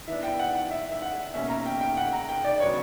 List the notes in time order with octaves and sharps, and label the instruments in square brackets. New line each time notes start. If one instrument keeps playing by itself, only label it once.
[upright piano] E3 B3 D4 E5
G5
F#5
F#5
E5
E5
F#5
B2 A#3 C#4 E5
A#5
G5
G5
F#5
A#5
G5
D5
C#3 F#3 B3 D4 C#5